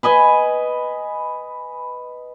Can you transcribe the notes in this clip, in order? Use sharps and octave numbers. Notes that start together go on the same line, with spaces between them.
B4 D#5 G#5 B5